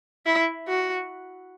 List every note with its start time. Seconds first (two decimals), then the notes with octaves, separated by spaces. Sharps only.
0.26 E4
0.68 F#4